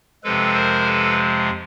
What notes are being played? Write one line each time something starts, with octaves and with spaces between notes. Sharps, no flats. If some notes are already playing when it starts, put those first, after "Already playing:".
F2 C3 F3 G#3 A4 B4
A#4 C5
A4 B4